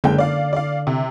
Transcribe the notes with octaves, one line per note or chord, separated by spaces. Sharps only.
F#1 D3 G#3 G5
D5 F5
D5 F5
C3